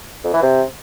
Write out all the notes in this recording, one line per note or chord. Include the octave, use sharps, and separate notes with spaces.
F2
E3
C3